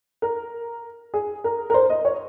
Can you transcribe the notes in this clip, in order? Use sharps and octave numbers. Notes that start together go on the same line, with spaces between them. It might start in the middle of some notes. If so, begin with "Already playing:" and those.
A#4
G#4
A#4
A#4
C5
D#5
C#5